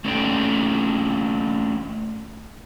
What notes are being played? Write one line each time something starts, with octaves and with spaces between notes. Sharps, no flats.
A3 C#4 D4 A4 G5